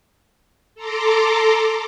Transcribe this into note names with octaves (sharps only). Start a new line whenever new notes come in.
A4 A#5 C6 D6